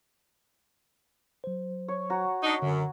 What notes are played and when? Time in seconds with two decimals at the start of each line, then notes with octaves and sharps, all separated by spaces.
1.44 F#3 C5
1.88 C#5
2.10 F#4 A#5
2.43 D4 D#4
2.62 F#2 D3